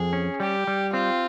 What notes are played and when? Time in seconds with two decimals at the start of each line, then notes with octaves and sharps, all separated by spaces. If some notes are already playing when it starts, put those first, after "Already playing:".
Already playing: F2 G#4
0.13 C#4
0.40 G3 G4
0.67 G3
0.93 C4 F4